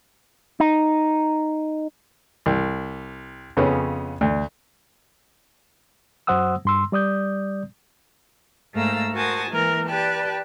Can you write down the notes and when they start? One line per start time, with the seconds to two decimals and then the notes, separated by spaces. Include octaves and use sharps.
0.60 D#4
2.46 C2
3.57 F2 C#3 B3 C#4
4.21 D2
6.27 F#2 F#3 C5 F#5 D#6 E6
6.65 G2 C6 E6
6.92 G3 D5 D#6 G6
8.74 G#2 A3 A#3 F5 A#5 E6
9.14 F#4 A#4 C5 G#5 A5 D#6
9.50 E3 G#3 A#3 A#4
9.85 G4 B4 D5 G5 A5